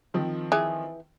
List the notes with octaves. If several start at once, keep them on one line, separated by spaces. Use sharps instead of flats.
D#3 F3 C4
E3 G#4